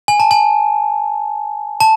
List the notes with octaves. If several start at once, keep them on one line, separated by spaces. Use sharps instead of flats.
G#5
A5
G#5
A5